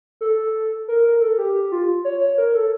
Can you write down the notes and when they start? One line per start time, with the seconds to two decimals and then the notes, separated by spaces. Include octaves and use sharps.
0.21 A4
0.88 A#4
1.04 A#4
1.21 A4
1.38 G4
1.55 G4
1.72 F4
2.05 C#5
2.21 C#5
2.38 A#4
2.54 A4